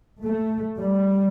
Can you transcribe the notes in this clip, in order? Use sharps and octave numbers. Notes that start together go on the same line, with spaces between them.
A3
G3